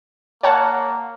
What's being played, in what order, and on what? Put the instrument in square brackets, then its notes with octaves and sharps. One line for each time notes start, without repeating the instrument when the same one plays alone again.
[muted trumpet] A#3 [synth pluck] C#5 F#5 A5